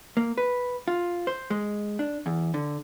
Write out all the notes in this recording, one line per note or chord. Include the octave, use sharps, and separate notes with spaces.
A#3
B4
F4
C5
G#3
D4
E2
D3